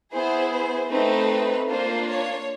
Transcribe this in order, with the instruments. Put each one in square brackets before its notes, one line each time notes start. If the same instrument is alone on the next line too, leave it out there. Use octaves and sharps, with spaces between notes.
[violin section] B3 E4 G#4 C5
C5
A3 C4 D#4 B4
A#3 D4 F4 C5
C#5